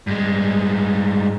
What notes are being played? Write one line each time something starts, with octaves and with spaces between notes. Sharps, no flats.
G2 G#3